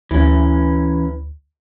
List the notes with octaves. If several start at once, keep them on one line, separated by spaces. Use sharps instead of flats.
D2 E3 C#4